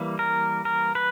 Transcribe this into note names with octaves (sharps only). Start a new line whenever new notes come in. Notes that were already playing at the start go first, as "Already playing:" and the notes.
Already playing: E3 G3 A#3
A#4
A#4
B4